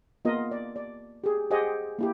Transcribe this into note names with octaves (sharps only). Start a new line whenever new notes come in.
A#3 B3 F4 A#4 D#5
D5
D5
G4 G#4
G4 G#4 C5 D#5 F#5 G#5
A#3 E4 G4